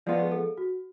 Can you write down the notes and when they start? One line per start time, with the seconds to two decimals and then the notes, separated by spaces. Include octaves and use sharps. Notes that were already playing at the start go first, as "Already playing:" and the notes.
0.07 F3 G#3 B3 F4 D5
0.22 G#4
0.32 A4
0.58 F#4